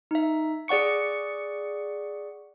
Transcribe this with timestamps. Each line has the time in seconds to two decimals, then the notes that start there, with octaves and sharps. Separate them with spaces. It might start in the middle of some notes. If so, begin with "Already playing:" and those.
0.11 D#4 E5
0.68 G#4 D5 F#5 C#6 C#7